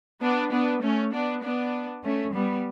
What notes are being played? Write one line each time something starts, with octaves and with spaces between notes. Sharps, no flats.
B3 D4
B3 D4
A3 C#4
B3 D4
B3 D4
A3 C#4
G3 B3